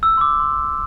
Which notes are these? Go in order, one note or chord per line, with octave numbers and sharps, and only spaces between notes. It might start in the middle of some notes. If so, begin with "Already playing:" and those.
E6
C6
D6
C6